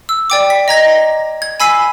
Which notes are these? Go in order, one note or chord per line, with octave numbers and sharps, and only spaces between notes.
E6
D5 G5 D6
B6
D#5 A#5 G#6 A#6
G#6
G#5 B5 E6 B6 C7 D#7